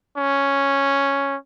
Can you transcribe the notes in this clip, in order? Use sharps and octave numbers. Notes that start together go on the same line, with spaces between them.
C#4